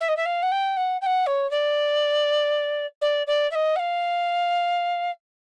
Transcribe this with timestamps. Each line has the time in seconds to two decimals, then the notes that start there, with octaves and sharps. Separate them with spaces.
0.01 E5
0.09 D#5
0.17 E5
0.26 F5
0.43 F#5
0.52 G5
0.77 F#5
1.01 G5
1.06 F#5
1.27 C#5
1.51 D5
3.01 D5
3.27 D5
3.51 E5
3.55 D#5
3.76 F#5
3.79 F5